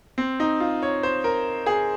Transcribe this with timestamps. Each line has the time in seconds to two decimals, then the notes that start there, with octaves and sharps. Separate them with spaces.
0.18 C4
0.40 D#4
0.60 F4
0.82 C#5
1.03 C5
1.24 A#4
1.66 G#4